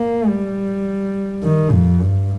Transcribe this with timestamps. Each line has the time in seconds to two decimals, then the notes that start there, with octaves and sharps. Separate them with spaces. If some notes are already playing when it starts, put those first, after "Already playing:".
Already playing: A#3
0.28 G3
1.43 D#3
1.72 F2
2.01 G2